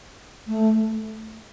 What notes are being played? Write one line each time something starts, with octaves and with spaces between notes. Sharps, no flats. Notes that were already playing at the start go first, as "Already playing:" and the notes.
A3